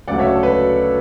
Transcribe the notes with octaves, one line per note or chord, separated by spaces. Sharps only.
D2 C#3 F#3 A3 D5 F#5
C#5 E5
A4
B4